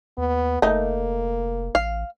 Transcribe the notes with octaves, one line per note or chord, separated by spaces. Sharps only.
D#2 B3
F1 A3 A#3 D#4
A1 F5